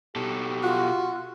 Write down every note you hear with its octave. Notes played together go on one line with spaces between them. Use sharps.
B2 G4 A4
F4 F#4